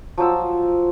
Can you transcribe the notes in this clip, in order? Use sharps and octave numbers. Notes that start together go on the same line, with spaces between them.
F3 F#3 C5 E6